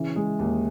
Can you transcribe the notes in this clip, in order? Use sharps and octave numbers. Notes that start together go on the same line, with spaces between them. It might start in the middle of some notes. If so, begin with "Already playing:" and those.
Already playing: C#3 E3
G#3
D#2